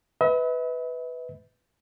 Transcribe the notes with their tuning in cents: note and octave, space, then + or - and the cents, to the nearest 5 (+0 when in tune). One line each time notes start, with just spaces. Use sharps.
B4 +10 E5 -45